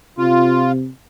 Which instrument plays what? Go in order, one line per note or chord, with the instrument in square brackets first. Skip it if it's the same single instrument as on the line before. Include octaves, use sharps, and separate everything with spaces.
[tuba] C3 [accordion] F4